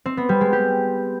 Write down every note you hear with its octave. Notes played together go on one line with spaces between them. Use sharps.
C4
B3
G3
G#3
G4